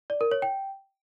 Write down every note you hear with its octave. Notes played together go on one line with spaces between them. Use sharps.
D5
A#4
C#5
G5